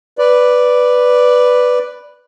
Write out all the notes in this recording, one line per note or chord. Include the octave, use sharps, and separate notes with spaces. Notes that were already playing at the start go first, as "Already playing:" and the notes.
B4 D5